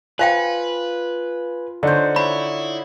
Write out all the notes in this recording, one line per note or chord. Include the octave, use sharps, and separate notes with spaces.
F4 B4 C5 F5 G5 G#5
D3 D#4 C5 C#5
E4 C#5 B5